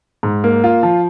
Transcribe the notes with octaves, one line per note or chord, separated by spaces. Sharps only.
G#2
A#3
F4
F3